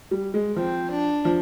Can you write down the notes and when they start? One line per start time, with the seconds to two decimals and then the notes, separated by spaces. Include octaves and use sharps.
0.11 G3
0.34 G#3
0.56 F3 C4
0.91 D4
1.25 F3